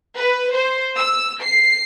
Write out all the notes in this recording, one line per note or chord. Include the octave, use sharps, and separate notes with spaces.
B4
C5
E6
C7